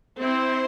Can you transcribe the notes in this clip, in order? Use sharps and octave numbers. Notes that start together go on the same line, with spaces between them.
C4 E4 C5